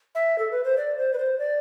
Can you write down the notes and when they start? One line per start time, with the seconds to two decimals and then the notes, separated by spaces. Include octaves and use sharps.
0.15 E5
0.38 A4
0.51 B4
0.64 C5
0.78 D5
0.98 C5
1.14 B4
1.19 C5
1.39 D5